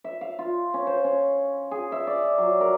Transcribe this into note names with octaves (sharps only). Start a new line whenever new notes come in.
E5
F5
F4
C#4
C5
C#4
G#4
E5
D5
F#3
A#4